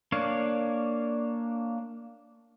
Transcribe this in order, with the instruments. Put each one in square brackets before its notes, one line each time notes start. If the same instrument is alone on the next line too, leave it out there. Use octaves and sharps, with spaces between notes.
[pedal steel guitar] A#3 D4 C#5 F5